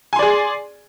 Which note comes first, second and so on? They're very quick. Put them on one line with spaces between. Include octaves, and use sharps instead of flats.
G#5 C6 D5 G#4